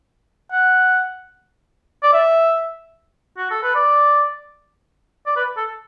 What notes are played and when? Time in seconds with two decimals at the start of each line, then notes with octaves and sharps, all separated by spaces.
0.52 F#5
2.03 D5
2.13 E5
3.38 F#4
3.51 A4
3.63 B4
3.75 D5
5.26 D5
5.36 B4
5.57 A4